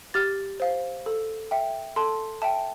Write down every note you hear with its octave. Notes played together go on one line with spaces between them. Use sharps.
G4 F6 A6
C5 F5
A4
E5 G5
A4 A5 C6
E5 G5 A5